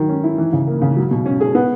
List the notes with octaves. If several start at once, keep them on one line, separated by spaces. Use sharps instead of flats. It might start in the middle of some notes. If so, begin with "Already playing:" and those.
Already playing: D#3 F#3
C#4
E4
E3
C#3
A#3
C#3
F#3
B2
C#4
G#4
B3